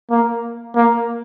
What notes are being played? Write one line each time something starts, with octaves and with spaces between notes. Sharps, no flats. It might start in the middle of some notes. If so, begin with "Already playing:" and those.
A#3
A#3